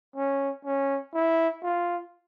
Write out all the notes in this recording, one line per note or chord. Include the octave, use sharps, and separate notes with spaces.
C#4
C#4
E4
F4